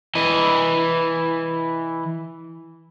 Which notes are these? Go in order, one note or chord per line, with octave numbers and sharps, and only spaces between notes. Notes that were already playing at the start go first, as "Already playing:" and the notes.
E3 D#5